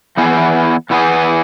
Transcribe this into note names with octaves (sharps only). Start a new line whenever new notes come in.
E2 E3 B3 E4 G#4
E2 E3 B3 E4 G#4